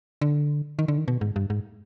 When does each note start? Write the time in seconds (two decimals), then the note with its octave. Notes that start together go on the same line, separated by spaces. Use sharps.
0.21 D3
0.79 D#3
0.88 D3
0.98 D#3
1.08 B2
1.21 G#2
1.36 G2
1.50 G#2